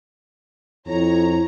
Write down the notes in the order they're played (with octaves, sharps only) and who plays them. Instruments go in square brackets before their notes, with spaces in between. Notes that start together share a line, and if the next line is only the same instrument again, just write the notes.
[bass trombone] F2 [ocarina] E4 [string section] C#5 A#5